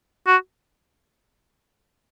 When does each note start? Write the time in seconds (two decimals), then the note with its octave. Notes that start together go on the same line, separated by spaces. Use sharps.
0.27 F#4